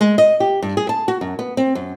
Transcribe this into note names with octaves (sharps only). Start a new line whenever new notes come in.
G#3
D#5
G4
G2
G#4
A5
F#4
F#2
B3
C4
F#2